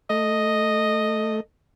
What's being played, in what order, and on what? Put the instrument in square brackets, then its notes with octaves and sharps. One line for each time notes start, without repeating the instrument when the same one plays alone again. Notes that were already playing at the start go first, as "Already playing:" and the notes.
[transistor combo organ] A3 [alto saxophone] D#5